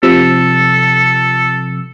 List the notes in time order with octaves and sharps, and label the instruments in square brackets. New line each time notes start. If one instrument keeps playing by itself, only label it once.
[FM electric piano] C3 F3 E6 [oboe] A4